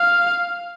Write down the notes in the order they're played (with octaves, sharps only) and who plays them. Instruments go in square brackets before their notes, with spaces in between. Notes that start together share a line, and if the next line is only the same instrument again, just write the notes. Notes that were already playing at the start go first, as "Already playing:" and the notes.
Already playing: [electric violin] F5